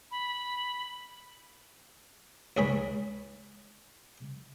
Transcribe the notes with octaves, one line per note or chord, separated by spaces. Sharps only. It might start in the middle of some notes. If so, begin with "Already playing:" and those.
B5
C#2 G#2 G#4 C#5 B5